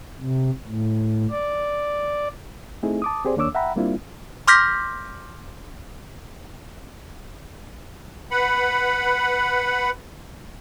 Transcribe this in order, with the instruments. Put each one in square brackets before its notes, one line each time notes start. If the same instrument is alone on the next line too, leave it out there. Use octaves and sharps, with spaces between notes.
[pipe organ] C3
A2
D5
[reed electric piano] A3 C4 D#4 E4 G#4
A5 D6 D#6
C4 G4 G#4 C5 D5
D#2 A#3 D4 C#5 D6 E6
E5 F#5 G5 A#5 B5
G3 A#3 C4 D4 E4 F4
[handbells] C6 D6 F6 G6 A#6 B6
[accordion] B4 F#5 B5